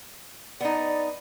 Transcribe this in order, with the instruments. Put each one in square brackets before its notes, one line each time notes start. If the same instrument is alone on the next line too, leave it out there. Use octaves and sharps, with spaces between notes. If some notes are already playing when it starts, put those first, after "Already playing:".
[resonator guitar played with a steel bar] B3 D#4 [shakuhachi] D5